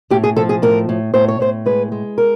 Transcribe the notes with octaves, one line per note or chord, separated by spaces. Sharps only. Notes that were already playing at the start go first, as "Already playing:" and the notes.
A2 G4
G#4
F3 A4
G#4
A2 A#4
A2
A2 C5
C#5
A2 C5
G#3 B4
G#3
A#4